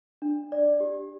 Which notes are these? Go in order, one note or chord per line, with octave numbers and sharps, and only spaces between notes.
D4
D5
G4